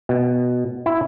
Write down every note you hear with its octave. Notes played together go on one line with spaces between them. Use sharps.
B2
E4